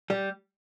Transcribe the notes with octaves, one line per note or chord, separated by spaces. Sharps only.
G3 G4